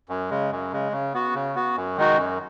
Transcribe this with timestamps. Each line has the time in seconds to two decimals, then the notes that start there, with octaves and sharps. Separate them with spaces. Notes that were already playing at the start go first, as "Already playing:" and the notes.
0.09 F#2
0.30 C#3 G#3
0.52 F#2
0.72 C#3 G#3
0.92 C#3
1.14 B3 F#4
1.34 C#3
1.55 B3 F#4
1.76 F#2
1.97 D#3 G#3 D#4 F#4
2.17 F#2